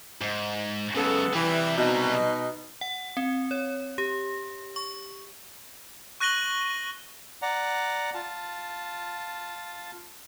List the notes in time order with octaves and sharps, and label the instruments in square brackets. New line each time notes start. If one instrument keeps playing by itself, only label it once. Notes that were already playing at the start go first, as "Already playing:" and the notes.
[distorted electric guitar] G#2
[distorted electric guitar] F#2 C#3 [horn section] G#3 B3 A4
[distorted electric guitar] C3 G3 [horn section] E3
[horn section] B2 D#4
[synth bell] F#5
C4
C#5
G4
C#6
[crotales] C#6 F#6 A#6 D#7 F#7 G7
[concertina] D5 F#5 A#5
F4 A5